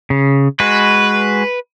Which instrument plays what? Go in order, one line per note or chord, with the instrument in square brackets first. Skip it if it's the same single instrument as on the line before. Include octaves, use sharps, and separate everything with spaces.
[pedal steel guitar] C#3
[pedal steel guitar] G#3 F#4 [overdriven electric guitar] B4